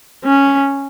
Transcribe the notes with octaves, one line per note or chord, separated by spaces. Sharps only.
C#4